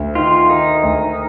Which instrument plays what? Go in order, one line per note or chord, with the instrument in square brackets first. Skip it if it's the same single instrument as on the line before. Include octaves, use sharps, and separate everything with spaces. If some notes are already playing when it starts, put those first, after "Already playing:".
Already playing: [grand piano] D2
[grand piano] D#3 [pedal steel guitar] F4
[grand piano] D#3 [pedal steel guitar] D#4
[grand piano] D2